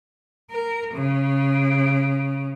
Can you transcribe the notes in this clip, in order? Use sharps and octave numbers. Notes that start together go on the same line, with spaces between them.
A#4
C#3